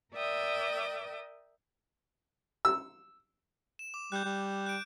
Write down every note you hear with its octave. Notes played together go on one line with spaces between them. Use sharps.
A#4 D5 E5 G5 D#6
E6
E7
D6
G3 F#6 G6
G3
F#6 D7